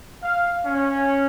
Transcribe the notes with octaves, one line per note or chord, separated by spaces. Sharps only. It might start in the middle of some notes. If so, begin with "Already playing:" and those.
F5
C#4